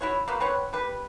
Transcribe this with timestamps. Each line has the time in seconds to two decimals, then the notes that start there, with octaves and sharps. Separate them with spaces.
0.01 E4 F#4 C#5
0.28 A#3 B3 F#4
0.40 C4 B4 C#5 F#5
0.73 G3 B4